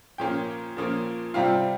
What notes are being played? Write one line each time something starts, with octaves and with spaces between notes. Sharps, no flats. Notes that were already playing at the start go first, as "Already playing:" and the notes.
A#2 F3 A#3 C#4 F4 G5
A#2 F3 A#3 C#4 F4
C3 G3 C4 F4 F5